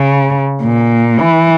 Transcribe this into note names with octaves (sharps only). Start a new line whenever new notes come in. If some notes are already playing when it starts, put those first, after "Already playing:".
Already playing: C#3
A#2
E3